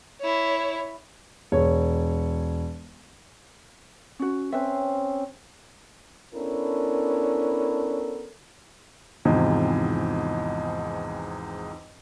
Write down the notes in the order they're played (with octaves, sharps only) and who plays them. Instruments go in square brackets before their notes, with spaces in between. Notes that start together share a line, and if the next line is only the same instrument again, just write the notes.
[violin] E4 C#5
[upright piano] E1 C#5
[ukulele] C#4 F#4
[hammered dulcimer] C4 C#4 [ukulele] B4 E5
[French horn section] B3 C#4 D4 E4 A4 A#4
[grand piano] G#1 E2 G#2 C3 E3 F3